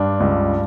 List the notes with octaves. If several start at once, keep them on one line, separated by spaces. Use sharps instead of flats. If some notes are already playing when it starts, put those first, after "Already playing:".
Already playing: G2 D4
C#2